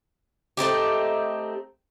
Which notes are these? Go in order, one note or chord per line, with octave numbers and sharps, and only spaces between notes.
A3 C4 D#4 G4